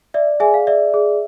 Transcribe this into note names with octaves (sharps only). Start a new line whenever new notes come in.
D5 E5
G#4 E5 G#5
F5
D5 E5
G#4